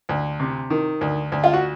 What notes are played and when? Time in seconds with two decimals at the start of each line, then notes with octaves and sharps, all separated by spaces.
0.09 D2
0.40 C3
0.70 D#3
1.01 D2
1.32 D2
1.44 F4
1.53 F#4